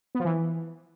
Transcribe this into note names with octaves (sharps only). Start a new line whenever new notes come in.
B3
F3
E3